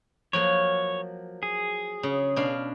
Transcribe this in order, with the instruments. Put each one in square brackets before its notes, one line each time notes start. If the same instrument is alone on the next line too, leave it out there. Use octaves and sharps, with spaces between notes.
[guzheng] F3 F#3 A#3 [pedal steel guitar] C#5
[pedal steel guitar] G#4
[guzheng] C#3
B2 D4 F5